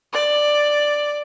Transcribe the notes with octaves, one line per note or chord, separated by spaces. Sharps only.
D5